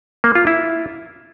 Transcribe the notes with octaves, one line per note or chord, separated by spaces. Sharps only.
A#3
F4
E4